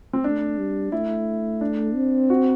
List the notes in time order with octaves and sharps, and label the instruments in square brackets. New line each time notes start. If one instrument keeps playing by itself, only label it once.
[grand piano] C4
[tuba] A3 [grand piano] D4
[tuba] G3
[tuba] A3 [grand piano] E4
[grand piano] D4
[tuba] C4
[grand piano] F#4